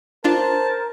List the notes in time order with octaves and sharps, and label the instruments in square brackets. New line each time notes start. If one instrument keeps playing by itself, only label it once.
[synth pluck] D4 F4 [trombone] A#4 [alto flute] C5 [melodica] A5